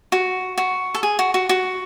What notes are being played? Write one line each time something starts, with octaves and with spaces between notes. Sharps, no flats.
F#4
F#4
A4
G#4
F#4
F#4
F#4